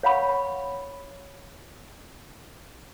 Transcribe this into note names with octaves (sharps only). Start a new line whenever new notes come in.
C#5 F5 F#5 B5 C#6